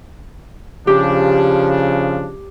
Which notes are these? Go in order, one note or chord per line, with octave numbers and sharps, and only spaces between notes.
C#3 F3 D4 G4